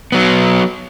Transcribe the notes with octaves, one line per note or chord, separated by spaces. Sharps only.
F#3 B3